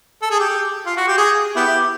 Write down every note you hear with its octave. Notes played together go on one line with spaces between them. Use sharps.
A4
G#4
G4
F4
F#4
G4
G#4
B3 E4 G4